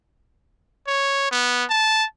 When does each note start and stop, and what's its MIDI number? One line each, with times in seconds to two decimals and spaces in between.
0.87 1.30 73
1.31 1.65 59
1.70 2.05 81